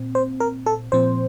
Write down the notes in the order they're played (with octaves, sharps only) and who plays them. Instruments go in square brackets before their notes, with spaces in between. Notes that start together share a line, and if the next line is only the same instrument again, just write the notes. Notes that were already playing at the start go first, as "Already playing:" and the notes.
Already playing: [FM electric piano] A#2 C4
C5
A#4
A4
A#2 F3 C4 C5